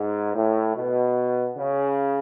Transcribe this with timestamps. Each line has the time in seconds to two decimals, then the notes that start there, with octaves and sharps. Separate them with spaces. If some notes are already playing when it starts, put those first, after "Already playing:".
Already playing: G#2
0.35 A2
0.75 B2
1.58 C#3